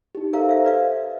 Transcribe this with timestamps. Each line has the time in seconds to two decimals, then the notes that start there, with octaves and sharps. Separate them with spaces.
0.15 D#4 G4
0.33 A4 A#4 C5 E5 F5 A#5
0.49 C5 E5 F5
0.65 B4 D5 D#5 F5